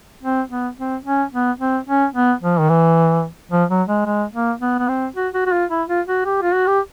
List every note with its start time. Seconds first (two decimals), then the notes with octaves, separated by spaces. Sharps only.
0.23 C4
0.49 B3
0.77 C4
1.05 C#4
1.32 B3
1.59 C4
1.87 C#4
2.14 B3
2.42 F3
2.59 D#3
2.69 E3
3.51 F3
3.70 F#3
3.88 G#3
4.06 G#3
4.33 A#3
4.60 B3
4.78 B3
4.88 C4
5.16 F#4
5.34 F#4
5.46 F#4
5.52 F4
5.70 E4
5.88 F4
6.07 F#4
6.25 G4
6.42 F4
6.54 F#4
6.67 G4